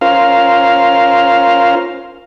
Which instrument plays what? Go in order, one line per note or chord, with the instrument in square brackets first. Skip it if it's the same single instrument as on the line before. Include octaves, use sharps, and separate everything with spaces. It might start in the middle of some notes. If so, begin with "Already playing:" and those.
[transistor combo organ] C#4 F4 A#4 C5 F5